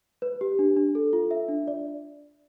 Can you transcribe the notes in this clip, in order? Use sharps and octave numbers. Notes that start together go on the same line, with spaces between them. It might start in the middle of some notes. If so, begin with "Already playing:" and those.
B4
G4
D4
D4
A4
F4
E5
D4
D5